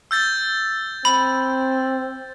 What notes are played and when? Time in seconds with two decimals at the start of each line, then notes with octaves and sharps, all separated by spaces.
0.11 E6 G6 A6
1.05 C4 B5